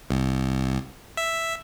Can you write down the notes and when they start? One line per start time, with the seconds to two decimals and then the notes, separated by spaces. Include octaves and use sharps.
0.10 C2
1.17 E5